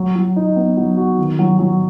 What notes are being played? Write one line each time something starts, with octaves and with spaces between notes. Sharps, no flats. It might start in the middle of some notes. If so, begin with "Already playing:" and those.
Already playing: F#3
F#3
D#4
B3
F#3
F#4
D#3
F#3
F#3